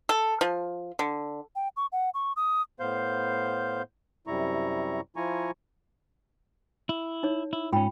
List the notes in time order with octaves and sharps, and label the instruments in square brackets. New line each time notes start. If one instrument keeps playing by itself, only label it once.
[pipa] A4
F3
D3
[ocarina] G5
C#6
F#5
C#6
D#6
[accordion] A2 B3 C5 F5 G6
F#2 C3 G3 E4 A#5 C#6
F3 E4 F4 G#5 A#5 C#6
[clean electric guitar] E4
[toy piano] D#4 C#5
[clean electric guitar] E4
[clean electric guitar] G#2 C#4 [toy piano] F4 G5 B5